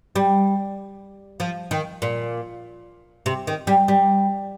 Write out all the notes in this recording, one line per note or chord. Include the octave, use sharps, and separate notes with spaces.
G3
F3
D#3
A#2
C3
D#3
G3
G3